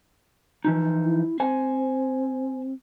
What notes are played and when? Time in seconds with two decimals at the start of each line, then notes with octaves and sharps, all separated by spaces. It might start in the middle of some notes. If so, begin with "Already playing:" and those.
0.65 E3 F3 D#4
1.05 E4
1.40 C4 C5 G#5